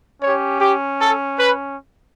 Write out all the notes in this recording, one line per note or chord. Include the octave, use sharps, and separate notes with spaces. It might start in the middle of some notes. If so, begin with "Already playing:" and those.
C#4 G4 C#5
G4
A4
B4